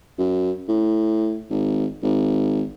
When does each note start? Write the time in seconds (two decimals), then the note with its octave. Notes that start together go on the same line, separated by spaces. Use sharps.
0.19 F#2
0.68 A2
1.50 G#1
2.03 G#1